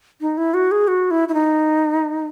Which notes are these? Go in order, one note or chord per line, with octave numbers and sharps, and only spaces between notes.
D#4
E4
F#4
G#4
F#4
E4
E4
D#4